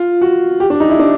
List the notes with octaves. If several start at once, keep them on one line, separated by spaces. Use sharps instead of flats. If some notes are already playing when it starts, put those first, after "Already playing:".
Already playing: F4
F#4
G4
D4
D#4
E4
D4